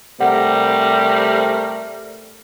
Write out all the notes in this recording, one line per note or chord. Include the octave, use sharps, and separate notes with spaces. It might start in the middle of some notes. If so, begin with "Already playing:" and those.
C3 G3 A3 A#4 F#5